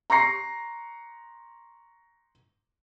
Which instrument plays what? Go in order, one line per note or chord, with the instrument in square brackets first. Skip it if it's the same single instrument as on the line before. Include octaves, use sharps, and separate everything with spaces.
[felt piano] A#5 C6 C#6 A#6 C7